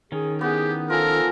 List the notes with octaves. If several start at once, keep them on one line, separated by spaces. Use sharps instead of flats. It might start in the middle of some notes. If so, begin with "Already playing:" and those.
D#3 C#4 G#4
B3 E4 G4 G#4
F3 A4 A#4 G#5